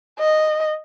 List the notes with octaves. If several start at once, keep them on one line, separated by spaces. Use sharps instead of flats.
D#5